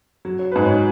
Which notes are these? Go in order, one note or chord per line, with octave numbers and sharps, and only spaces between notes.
F#3
C#5
G#2 B4
C#5